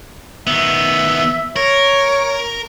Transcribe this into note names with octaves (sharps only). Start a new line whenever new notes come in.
D#3 B3 E5
A#4 C#5